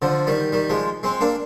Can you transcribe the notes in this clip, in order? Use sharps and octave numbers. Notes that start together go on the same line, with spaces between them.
D3 F3
D#3 G3
D#3 G3
F3 G#3
G#3 C4
A#3 D4